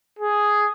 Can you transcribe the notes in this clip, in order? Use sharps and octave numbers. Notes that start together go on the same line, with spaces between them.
G#4